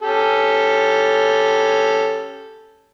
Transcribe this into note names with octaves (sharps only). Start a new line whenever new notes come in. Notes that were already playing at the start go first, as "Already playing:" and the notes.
C#4 G4 A4